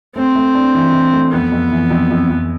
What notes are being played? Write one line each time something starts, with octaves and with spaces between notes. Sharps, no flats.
A3 C4
A3
D4
E3
E3
A3
F2 B3
F2
E3
F2
F2
F2